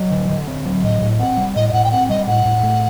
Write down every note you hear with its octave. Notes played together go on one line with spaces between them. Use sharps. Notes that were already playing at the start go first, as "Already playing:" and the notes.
Already playing: F#3 D#5
D3
D3
C4
F#3
A2 D#5
A2
C4 F#5
G3
A2 D#5
D#5
A2 F#5
G5
C4 F#5
G3 D#5
A2 F#5
A2
A3